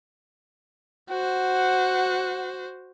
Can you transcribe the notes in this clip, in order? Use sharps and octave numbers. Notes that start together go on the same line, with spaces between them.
F#4 C5 F#5